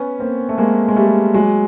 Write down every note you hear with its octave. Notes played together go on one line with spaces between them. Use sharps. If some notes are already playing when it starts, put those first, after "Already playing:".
Already playing: B3 C#4
A#3 C4
A3
G#3 A#3
G#3
G3 A3
F#3 G#3